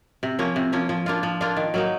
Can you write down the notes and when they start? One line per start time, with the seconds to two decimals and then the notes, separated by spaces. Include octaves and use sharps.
0.23 C3
0.39 F3 A#3 C#4
0.56 C3
0.73 F3 A#3 C#4
0.89 F3
1.06 A#3 D4 F4
1.23 F3
1.41 A#3 D4 F4
1.57 D#3
1.74 F#3 A#3 D#4